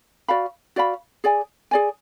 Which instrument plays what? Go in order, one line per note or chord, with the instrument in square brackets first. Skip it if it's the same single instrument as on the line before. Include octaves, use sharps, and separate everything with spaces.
[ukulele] F#4 D5 F5 B5
F#4 D5 F5 B5
G#4 D5 G#5
G#4 D5 G#5